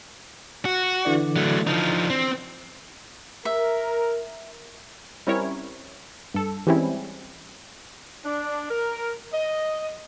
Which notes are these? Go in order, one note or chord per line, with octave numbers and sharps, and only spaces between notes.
F#4
D3 E3 D5
F#3 A3
F3 D#4
C4
A#4 E5
G3 C4 C#4 E4 A#4 C#5
G2 A4
E3 G3 G#3 C4 C#4 E4
D4
A#4
D#5